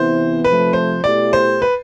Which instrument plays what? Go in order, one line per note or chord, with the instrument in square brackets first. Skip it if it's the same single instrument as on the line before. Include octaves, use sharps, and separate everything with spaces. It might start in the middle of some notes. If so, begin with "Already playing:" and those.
Already playing: [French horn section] C3 E3 B3 E4 [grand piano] C5
[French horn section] C3 F3 A3 [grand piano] B4
[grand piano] C5
[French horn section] B2 A3 E4 G4 [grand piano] D5
[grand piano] C5
B4